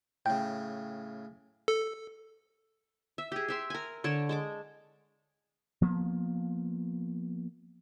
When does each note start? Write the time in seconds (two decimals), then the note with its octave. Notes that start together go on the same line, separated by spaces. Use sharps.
0.26 A2 C#3 G5
1.68 A4
3.18 E5
3.32 G4 G#4
3.48 G4 E5 C6
3.70 A#4 G#5
4.04 D3 C#5 D5 A5
4.29 G#3 A5 D6
5.82 F3 A#3 B3